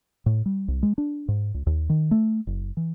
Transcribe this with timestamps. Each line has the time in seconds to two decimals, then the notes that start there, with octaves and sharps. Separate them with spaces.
0.26 A2
0.46 G3
0.68 C2
0.83 G#3
0.98 D4
1.28 G#2
1.54 C#2
1.67 D#2
1.89 D#3
2.11 A3
2.47 F#1
2.77 E3